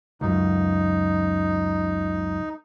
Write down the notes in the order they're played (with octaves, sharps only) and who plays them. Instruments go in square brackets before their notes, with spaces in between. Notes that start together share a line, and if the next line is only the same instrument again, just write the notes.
[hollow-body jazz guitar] C#2 F#2 [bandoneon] D#4